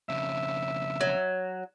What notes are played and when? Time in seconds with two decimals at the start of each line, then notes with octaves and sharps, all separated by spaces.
0.09 F2 C#3 E5
1.01 F#3